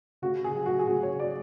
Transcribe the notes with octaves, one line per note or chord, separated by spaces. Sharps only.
C#3 F#4
G#4
F#3
F#4
G#4
C#3 F#4
C#5
F#3 D5